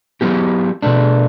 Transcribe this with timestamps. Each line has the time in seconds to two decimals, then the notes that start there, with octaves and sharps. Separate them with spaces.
0.21 F#3 B3 E4 G4
0.82 B2 A3 D4